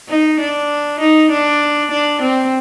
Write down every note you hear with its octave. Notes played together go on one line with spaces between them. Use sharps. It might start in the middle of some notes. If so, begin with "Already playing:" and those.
D#4
D4
D#4
D4
D4
C4